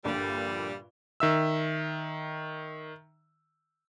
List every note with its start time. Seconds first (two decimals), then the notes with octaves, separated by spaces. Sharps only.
0.05 A#1 G2 A#2 D3 G3
1.20 D#3 E5 E6